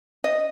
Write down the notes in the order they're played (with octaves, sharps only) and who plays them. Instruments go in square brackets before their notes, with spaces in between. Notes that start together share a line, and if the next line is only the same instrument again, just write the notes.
[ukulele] D#5